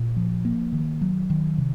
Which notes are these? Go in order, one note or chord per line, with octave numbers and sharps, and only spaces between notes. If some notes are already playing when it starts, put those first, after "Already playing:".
Already playing: A#2
F3
A#3
D#3
F#3
D#3
C3